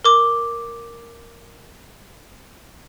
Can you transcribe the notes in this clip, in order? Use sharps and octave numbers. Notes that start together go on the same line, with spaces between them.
A#4 D6